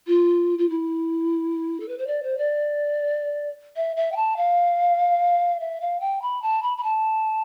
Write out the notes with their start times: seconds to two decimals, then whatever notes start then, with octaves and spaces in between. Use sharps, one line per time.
0.07 F4
0.58 F4
0.69 E4
1.80 A4
1.88 B4
1.98 C5
2.07 D5
2.23 C5
2.37 D5
3.76 E5
3.96 E5
4.12 G5
4.16 A5
4.37 F5
5.60 E5
5.81 F5
6.00 G5
6.22 B5
6.42 A5
6.62 B5
6.77 B5
6.83 A5